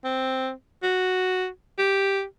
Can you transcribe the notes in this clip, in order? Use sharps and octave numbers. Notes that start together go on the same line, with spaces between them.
C4
F#4
G4